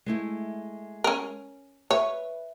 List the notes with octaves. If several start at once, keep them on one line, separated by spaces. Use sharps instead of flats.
G#3 A3 E4
C#4 A#4
B4 C#5 E5